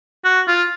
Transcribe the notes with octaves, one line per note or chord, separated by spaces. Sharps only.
F#4
F4